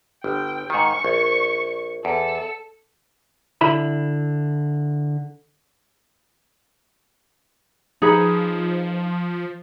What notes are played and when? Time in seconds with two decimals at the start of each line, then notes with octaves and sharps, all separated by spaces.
0.24 G1 G5
0.70 G#2 D#3 C#6
1.04 A#1
2.05 E2 A4
3.61 D3 E4 B5
8.02 F3 D#4 G#4 B4